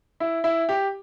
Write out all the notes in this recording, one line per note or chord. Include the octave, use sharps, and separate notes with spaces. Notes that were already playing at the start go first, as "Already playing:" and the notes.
E4
E4
G4